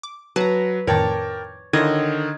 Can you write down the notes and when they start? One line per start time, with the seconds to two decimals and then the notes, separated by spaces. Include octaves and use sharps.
0.03 D6
0.36 F#3 B4 A5 A#5
0.87 F2 A2 D#3 A#4 C#5 D5 G5 A5
1.73 D3 D#3 E4 F4 C#5 D#5 G#6